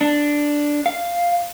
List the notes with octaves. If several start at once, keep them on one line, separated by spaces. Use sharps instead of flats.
D4
F5